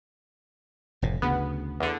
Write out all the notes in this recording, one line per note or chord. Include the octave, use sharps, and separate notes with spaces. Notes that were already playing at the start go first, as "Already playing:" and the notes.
F1 A2
D2 C#3 B3
E2 D3